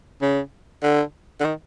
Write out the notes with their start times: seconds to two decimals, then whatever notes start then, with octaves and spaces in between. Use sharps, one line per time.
0.22 C#3
0.83 D3
1.40 D3
1.44 D#3